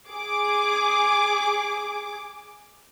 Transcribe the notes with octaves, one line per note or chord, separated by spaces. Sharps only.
G#4 D6